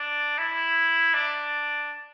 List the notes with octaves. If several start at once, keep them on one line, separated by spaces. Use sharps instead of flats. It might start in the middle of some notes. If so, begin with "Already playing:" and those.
Already playing: D4
E4
D4